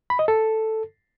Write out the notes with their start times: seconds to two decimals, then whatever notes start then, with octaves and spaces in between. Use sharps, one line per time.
0.10 B5
0.19 D#5
0.28 A4